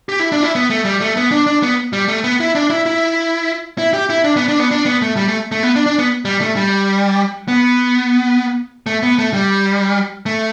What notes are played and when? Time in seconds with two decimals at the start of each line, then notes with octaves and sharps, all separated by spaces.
0.09 G4
0.20 E4
0.32 D4
0.43 E4
0.55 B3
0.70 A3
0.85 G3
1.01 A3
1.17 B3
1.31 D4
1.46 D4
1.63 B3
1.93 G3
2.08 A3
2.24 B3
2.40 E4
2.55 D4
2.70 E4
2.86 E4
3.78 E4
3.94 G4
4.10 E4
4.24 D4
4.37 B3
4.48 D4
4.59 B3
4.71 D4
4.86 B3
5.02 A3
5.16 G3
5.28 A3
5.52 A3
5.63 B3
5.75 D4
5.86 D4
5.99 B3
6.25 G3
6.41 A3
6.56 G3
7.48 B3
8.86 A3
9.03 B3
9.18 A3
9.33 G3
10.26 A3